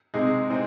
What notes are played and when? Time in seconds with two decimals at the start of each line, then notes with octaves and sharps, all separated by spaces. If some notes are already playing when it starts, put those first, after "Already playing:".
0.14 C3 G#3 D#4 G#4
0.49 C3 G#3 C4 D#4 G#4